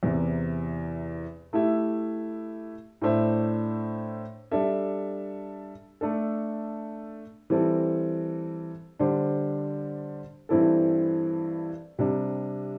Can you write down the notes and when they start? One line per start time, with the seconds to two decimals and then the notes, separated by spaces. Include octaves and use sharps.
0.03 E2 C3 E3
1.53 A3 E4 G4 E5
3.02 A2 A3 D4 C5 E5
4.52 G3 D4 A4 E5
6.01 A3 D4 A4
7.50 E3 G3 C4 A4
8.99 D3 G3 D4 C5
10.49 G2 E3 C4 E4 A4
11.99 C3 G3 D4